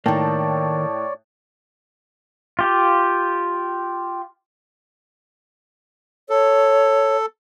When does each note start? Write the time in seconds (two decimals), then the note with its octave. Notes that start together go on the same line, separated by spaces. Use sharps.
0.06 A2 D#3 A#3 C#5 D5 G5 A5
2.59 F4 G4
6.29 A4 C#5